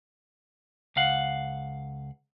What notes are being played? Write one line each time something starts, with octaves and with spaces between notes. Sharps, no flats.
C#2 F5 F#5